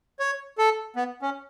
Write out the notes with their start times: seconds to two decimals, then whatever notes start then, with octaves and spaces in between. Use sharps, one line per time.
0.20 C#5
0.58 A4
0.96 B3
1.22 C#4